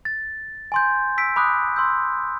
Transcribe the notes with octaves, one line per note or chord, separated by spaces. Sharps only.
A6
G#5 C6 G6
E6 B6 D7
B5 D6 D#6 F#6
C6 E6 G6